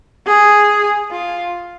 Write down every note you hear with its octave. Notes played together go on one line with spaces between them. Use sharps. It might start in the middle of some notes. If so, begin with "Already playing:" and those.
G#4
F4